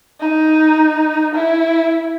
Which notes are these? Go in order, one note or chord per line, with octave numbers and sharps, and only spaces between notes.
D#4
E4